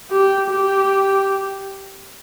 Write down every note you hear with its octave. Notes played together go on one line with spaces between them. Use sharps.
G4
G4